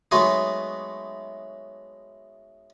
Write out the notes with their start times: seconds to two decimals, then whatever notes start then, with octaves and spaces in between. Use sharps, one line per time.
0.11 F#3 G#3 A3 B3 D#4